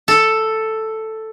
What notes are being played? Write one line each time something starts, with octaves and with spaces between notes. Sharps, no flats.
A4